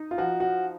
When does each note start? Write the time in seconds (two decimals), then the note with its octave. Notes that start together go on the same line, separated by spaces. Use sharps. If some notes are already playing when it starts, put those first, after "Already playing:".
Already playing: D#4
0.11 F4
0.18 F3 F#4
0.40 F#4